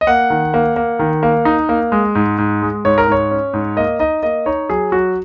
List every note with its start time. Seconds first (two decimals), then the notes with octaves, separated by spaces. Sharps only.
0.01 D#5
0.07 A#3 F#5
0.30 D#3
0.54 A#3
0.76 A#3
0.99 D#3
1.23 A#3
1.45 D#4
1.69 A#3
1.92 G#3
2.15 G#2
2.38 G#2
2.62 G#3
2.85 G#2 C#5
2.98 A#4
3.08 G#2 C#5
3.31 C#4
3.53 G#2
3.77 A#3 D#5
3.99 D#4 D#5
4.23 A#3 D#5
4.46 D#4 C#5
4.70 F#3 G#4
4.92 F#3 F#4